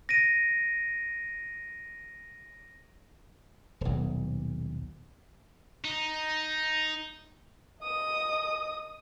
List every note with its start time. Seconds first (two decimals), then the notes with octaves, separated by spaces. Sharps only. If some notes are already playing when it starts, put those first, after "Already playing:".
0.09 A#6 D7 D#7
3.81 D#1 B1
5.85 D#4
7.82 D#5 D#6